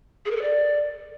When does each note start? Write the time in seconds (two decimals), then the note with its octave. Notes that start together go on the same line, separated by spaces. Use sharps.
0.25 G#4
0.31 A#4
0.36 A4
0.42 D5